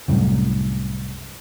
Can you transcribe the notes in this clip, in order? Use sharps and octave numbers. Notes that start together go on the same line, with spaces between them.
C2 F#2 A2